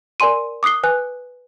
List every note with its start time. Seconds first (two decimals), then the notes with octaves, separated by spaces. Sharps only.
0.20 A#4 D5 G#5 C6 D#7
0.63 D6 D#6 F#6 C7 G7
0.83 B4 G#5 F#6